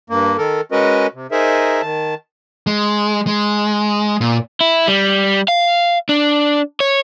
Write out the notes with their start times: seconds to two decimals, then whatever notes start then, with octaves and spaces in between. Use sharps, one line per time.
0.10 G2 A#3
0.38 D#3 A4 A#4
0.72 G#3 C#4 F#4 A#4 B4 D#5
1.14 C3
1.32 D#4 G#4 A#4 C5 E5
1.82 D#3 A5
2.67 G#3
3.27 G#3
4.21 A#2
4.61 E4
4.88 G3
5.48 F5
6.09 D4
6.80 C#5